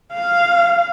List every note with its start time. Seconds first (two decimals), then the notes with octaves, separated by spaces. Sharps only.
0.13 F5